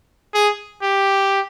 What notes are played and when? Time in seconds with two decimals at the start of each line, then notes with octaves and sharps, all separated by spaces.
0.34 G#4
0.83 G4